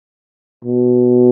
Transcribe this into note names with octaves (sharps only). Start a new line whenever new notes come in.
B2